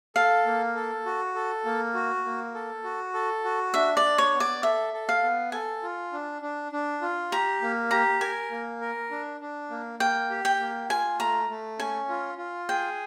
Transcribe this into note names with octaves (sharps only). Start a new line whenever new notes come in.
A4 F5
A#3
A4
F#4
A4
A#3
F#4
A#3
A4
F#4
A4
F#4
D4 E5
D5
D4
C#5
B3
D5
A4 E5
A4
F5
B3
A4 G#5
F4
D4
D4
D4
F4
G4 A#5
A#3
G4 A#5
A#4 G#5
A#3
A#4
D4
D4
A#3
A#3 G5
G4
G5
A#3
F4 G#5
A3 A#5
A3
C#4 G#5
F4
F4
G#4 G5